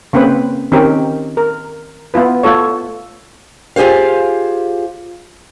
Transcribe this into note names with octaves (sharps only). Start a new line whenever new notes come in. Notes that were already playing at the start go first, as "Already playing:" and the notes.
C#3 A#3 C4 C#4 B4 C5
D#3 C4 C#4 G4 A#4
A#4
B3 E4 F4 B4
A3 F4 A4 C#5
F4 G4 G#4 C5 F5